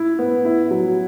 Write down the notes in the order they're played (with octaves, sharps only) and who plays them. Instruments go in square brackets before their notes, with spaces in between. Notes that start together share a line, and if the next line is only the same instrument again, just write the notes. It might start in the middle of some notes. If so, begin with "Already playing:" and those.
Already playing: [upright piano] E4
B3
E4
F#3